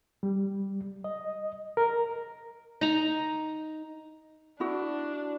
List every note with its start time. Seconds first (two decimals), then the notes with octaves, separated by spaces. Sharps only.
0.23 G3
1.04 D#5
1.77 A#4
2.81 D#4 A#5
4.60 D4 E4 F#4